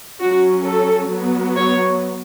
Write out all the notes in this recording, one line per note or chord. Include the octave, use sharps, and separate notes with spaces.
F#3 C#4 F#4
A4
F#3 B3
C#5